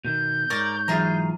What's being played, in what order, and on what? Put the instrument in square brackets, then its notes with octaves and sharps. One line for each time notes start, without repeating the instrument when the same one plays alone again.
[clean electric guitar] B2 D#3 [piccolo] G6
[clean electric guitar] G#2 C#5 [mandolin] A#4 D5
[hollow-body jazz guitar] E3 F#3 E5 [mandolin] F4 G#4 A#5